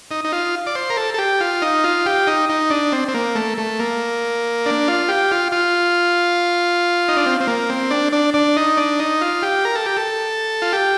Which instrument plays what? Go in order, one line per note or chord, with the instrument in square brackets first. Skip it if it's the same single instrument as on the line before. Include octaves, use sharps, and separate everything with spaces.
[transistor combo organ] D#4
D#4
F4
D5
C5
A#4
A4
A4
G4
F4
D#4
F4
G4
D#4
D#4
D4
C4
C4
A#3
A3
A3
A#3
D4
F4
G4
F4
F4
D#4
D4
C4
C4
A#3
C4
D4
D4
D4
D#4
D4
D#4
F4
G4
A#4
A4
G4
A4
F4
G4